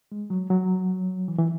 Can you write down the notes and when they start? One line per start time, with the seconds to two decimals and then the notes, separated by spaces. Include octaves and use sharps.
0.12 G#3
0.30 F#3
0.50 F#3
1.28 E3
1.38 E3